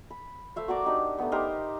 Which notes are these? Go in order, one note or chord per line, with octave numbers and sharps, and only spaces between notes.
B5
A3 C5 E5 F5
F#4 A#4 D5 D6
D4 D#4 G4
A3 B3
D#4 G4 A#4 C5